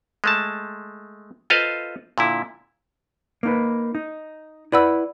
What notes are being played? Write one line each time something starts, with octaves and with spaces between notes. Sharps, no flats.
G#3 A3 A5
F4 A4 B4 C5 D#5 F5
A#2 D3 E4
A#3 D#4 B4
D#4
E4 B4 D5 F#5 B5 E6